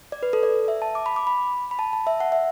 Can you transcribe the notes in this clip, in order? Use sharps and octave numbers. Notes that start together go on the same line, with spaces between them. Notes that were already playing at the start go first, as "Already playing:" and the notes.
D5
B4
A4
D5
E5
A5
D6
B5
D6
B5
B5
A5
A5
E5
F#5
E5